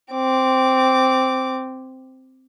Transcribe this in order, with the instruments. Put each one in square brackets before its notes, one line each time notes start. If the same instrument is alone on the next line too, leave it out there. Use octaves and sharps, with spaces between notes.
[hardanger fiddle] C4 D6